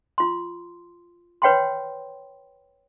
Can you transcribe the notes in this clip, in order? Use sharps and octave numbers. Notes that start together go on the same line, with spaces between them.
F4 C6
B4 C#5 F#5 G5 B5 C6